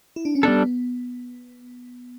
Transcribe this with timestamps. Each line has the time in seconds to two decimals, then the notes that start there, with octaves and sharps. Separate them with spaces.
0.16 E4
0.25 D4
0.35 C#4
0.43 G3 B3 D4 A4